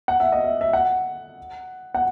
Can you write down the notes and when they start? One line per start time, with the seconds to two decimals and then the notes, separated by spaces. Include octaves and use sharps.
0.08 F#5
0.20 E5
0.32 D#5
0.44 E5
0.61 E5
0.73 F#5
1.94 F#5